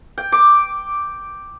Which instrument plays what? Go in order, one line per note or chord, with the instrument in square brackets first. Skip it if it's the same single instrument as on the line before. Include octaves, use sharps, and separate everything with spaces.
[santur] G5
D6